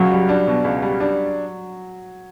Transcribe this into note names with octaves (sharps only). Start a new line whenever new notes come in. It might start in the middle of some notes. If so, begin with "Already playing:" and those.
Already playing: C#2 F#3
G3
D4
B2
C#2
G3
D4